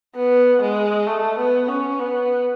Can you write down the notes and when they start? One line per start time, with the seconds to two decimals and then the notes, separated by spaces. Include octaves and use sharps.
0.16 B3
0.62 G#3
1.07 A3
1.38 B3
1.68 C#4
1.99 B3